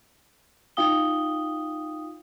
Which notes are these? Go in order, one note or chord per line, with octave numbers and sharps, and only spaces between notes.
D#4 F4 F5 G5 D#6 G7